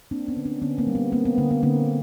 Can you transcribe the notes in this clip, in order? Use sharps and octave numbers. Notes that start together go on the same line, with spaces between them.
A#3 C4 D4
B3 C#4
D3
C4 D4
D3 B3 C#4
A#3 C4
G3
B3
A#3 C4
B3
D3 A#3
B3
D3 A#3 C4